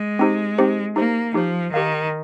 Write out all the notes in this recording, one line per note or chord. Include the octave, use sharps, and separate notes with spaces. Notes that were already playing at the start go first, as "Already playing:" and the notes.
Already playing: G#3
C4 D#4 G4 C5
C4 D#4 G4 C5
A#3 D#4 G4 C5
F3 D#4 G4 C5
D#3 G4 A#4 F5